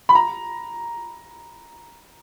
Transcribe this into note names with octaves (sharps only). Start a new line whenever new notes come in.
B5
A#5